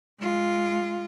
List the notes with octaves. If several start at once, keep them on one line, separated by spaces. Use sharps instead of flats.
G#3 F4